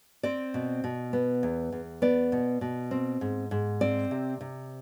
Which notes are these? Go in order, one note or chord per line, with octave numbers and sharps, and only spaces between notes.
C4 D5
B2
B2
B3
E2
E2
B3 D5
B2
B2
C4
G#2
G#2
C4 D5
C3
C3